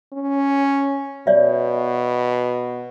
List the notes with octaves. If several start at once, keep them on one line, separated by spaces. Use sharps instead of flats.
C#4
B2 C#5 D5 E5